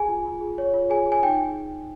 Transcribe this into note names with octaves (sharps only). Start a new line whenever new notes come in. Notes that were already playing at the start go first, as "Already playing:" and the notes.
Already playing: G#4 G#5
F4
F4
G#4
C#5
F4
G#4 G#5
G#4
G#5
D#4 G5